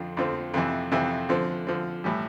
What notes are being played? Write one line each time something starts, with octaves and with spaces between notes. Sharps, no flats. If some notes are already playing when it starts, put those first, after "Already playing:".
Already playing: F2 D3 F3 C4 F4
F2 D3 F3 C4 F4
F2 C3 E3
F2 C3 E3
D3 F3 C4
D3 F3 C4
A2 E3 G3